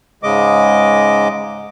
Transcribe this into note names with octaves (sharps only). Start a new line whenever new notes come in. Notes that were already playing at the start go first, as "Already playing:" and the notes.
G#2 C#3 G#3 D#5 D6